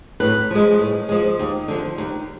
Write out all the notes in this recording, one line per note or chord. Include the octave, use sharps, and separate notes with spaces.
A2 B4
F3 G#3
A2
F3 G#3
D#2
D3 F3
D#2